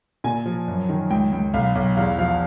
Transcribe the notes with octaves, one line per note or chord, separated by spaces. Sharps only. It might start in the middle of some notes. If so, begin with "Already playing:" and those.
A#2 G#5
F3
F#2
D#3
C#2 G5
C#2
B1 F5
B1
E2 F5
F3 F5